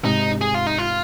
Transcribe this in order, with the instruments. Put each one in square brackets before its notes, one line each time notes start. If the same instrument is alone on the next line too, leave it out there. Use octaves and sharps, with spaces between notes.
[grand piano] G#2 C3 [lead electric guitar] D#4
[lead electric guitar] G#4
F4
D#4
F4